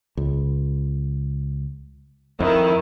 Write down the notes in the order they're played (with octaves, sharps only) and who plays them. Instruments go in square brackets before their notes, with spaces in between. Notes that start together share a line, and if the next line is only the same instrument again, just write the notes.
[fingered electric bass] C#2
[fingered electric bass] F2 [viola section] D#3 [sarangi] E4